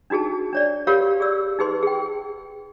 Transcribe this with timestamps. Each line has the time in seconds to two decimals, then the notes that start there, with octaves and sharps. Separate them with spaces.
0.10 D4 D#4 F#4 G#4 A5
0.53 D4 C#5 D5
0.87 G4 A#4 C#5 F5 B5
1.20 G#4 D5 E6
1.59 D#4 G#4 B4 C6
1.83 G#4 G5